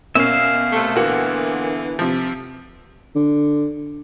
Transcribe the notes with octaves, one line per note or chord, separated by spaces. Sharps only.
B2 A#3 C#4 E5 F5
C3 A3
A#2 D3 E3 A#3 B3 F#4
C3 F3
D3